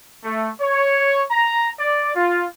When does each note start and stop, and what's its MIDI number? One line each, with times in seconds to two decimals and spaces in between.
0.24 0.50 57
0.60 1.23 73
1.31 1.70 82
1.79 2.15 74
2.16 2.47 65